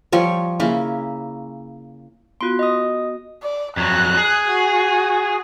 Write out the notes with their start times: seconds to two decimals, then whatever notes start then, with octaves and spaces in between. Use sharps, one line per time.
0.12 F3 G3 C#5
0.60 C#3 A#3 E4
2.41 B3 F4 F#4 C6
2.59 D#5 D#6
3.43 D5
3.77 F2 F#3 F#6
4.17 G#4
4.46 F#4